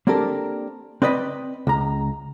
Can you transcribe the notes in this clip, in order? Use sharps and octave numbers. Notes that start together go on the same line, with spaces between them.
A#3 C4 D4 G4 A4 A#4
C4 B4 D5 D#5 B5
C#2 A#5